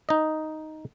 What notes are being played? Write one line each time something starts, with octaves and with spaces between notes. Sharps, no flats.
D#4 D#5